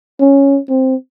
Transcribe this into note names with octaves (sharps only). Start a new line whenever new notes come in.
C#4
C4